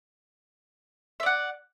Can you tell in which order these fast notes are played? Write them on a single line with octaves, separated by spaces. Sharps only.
E5 D5 F#5